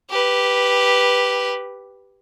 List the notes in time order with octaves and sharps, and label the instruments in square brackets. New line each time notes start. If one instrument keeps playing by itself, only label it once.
[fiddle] G4 B4